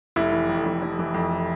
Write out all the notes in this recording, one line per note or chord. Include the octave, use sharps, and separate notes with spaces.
F1 E4
E3
F2
F1
F1
E3
F2